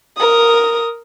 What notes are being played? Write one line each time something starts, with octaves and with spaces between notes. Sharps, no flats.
A#4 D#6